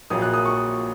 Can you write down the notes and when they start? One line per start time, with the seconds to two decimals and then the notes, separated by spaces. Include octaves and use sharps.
0.10 A#1 A#2 F#3 D#6
0.22 F#6
0.34 D#6
0.45 C#6